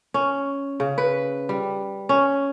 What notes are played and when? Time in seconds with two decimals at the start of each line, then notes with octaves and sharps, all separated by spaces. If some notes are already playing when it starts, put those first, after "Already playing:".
0.14 C#4
0.80 C#3
0.98 B4
1.49 G3
2.09 C#4